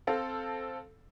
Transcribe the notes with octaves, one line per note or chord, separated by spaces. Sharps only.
C4 A4 F5